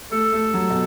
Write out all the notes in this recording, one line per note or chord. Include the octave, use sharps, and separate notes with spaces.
A3 A4
A3
F#3
B2